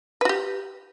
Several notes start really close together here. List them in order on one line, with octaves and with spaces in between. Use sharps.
B4 F#4 G4